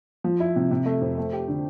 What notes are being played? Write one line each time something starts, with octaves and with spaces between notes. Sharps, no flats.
F3
E4
C3
C3
A3
F2
A3
G4
D3